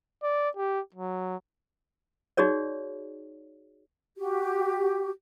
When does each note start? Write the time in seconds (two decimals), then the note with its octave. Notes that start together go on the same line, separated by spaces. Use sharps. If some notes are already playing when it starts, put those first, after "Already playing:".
0.23 D5
0.56 G4
0.94 F#3
2.37 D#4 F#4 G#4 C#5 D5
4.16 F#4 G4